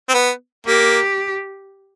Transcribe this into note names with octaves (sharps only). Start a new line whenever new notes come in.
C4
B3
A#3 G4